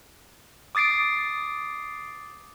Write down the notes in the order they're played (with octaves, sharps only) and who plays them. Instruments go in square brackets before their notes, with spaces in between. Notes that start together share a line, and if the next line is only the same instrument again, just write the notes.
[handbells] D6 D#6 A6 C7 D7